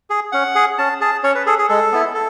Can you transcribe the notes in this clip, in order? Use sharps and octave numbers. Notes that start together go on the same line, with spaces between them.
G#4
C#4 F#5
G#4
C#4 A5
G#4 A5
C#4 C#5
B4
G#4 A4
G#4
G#3 A4
B3 E4
A4